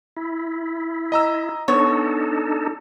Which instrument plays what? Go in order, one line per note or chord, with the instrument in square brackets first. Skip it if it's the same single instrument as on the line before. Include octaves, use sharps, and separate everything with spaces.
[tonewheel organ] E4
[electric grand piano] D#5 A#5 E6
[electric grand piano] B3 [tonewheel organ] D4 D#4 A4 [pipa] C#5